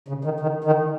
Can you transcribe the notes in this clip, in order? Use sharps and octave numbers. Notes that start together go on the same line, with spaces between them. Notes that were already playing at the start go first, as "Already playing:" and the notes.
C#3
D#3
D#3
D#3